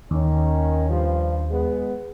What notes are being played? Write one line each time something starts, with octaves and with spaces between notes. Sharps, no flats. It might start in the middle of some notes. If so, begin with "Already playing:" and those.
D#2 D#3 C#4
G2 F3
G#3 B3